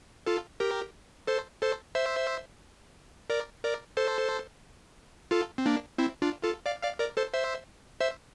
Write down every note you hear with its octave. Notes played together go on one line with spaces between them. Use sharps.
F4 A4
G4 A#4
A4 C5
A4 C5
C5 E5
A#4 D5
A#4 D5
A4 C5
F4 A4
C4
A#3 D4
C4 E4
D4 F4
F4 A4
D5 F5
D5 F5
A#4 D5
A4 C5
C5 E5
C5 E5